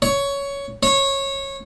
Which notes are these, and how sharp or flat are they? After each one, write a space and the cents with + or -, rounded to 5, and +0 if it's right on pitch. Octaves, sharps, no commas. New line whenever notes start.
C#5 +10
C#5 -20